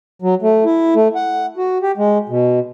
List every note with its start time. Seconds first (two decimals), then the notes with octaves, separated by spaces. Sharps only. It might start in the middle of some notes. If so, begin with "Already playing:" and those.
0.22 F#3
0.42 A3
0.65 E4
0.95 A3
1.15 F#5
1.57 F#4
1.83 G4
1.97 G#3
2.29 B2